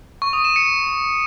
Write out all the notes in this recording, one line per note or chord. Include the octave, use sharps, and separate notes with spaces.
C#6
D#6
E7
C#7